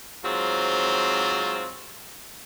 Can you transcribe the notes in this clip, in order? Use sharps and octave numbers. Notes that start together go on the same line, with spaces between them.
G#2 F#3 C4 F4